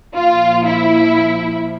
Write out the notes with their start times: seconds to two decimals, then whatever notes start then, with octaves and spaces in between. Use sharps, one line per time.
0.15 A#2 F3 F4
0.66 E4